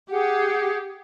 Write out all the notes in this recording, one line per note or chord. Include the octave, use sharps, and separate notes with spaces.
G4 G#4 F#5